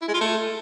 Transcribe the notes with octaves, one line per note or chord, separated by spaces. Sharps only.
E4
G#3
F4
A3